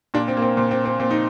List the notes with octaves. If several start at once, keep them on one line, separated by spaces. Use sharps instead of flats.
A#2 D4
C4
A#3
C4
A#2 C4
C4
C4
A#2 C4
D#4